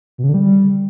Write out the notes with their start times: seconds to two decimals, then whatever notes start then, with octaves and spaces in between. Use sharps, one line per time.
0.18 B2
0.24 C#3
0.29 D3
0.34 G3